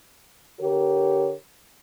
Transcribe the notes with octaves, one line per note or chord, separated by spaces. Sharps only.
D3 G4 A#4 C#5